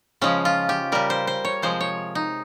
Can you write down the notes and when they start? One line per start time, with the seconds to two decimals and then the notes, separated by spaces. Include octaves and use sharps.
0.21 C#3 F3 G#3 C#4
0.45 F4
0.69 G4
0.92 C#3 G3 A#4
1.10 C5
1.27 C5
1.45 C#5
1.62 C3 F3 G#3 C5
1.80 C#5
2.15 D#4